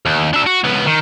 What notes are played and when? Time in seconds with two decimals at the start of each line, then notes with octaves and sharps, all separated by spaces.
0.06 D#2
0.33 D4 E5
0.46 F#4
0.64 C#2 B3
0.86 D#3